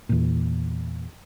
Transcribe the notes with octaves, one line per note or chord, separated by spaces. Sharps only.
E2 A#2